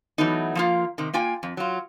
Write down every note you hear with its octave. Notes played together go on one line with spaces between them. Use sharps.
E3 F#3 A3 B3 D#4
F3 A#3 F4
C3 D#3
A#3 F4 G5 G#5
F2
F#3 F4